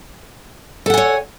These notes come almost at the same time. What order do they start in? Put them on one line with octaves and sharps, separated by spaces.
A4 F#5 G#5 C#5